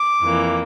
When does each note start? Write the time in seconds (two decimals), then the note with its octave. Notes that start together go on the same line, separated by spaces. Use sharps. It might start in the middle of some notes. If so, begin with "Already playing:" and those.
Already playing: D6
0.22 F2 E3 A#3